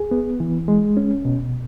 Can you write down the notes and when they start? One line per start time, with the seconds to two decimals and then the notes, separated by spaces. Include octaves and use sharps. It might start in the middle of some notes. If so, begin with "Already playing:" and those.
Already playing: G#4
0.11 B3
0.40 E3
0.68 G#3
0.97 C#4
1.25 B2